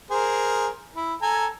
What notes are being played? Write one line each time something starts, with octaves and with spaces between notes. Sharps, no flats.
G#4 A#4 C5
E4
A4 G#5 A#5